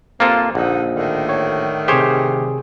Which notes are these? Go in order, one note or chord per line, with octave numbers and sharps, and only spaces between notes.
G2 C3 A#3 C4 F4 A4
A#1 D3 D#4 F#5
A2 D3 D#3
C#5
C3 G4 G#4 C5 C#5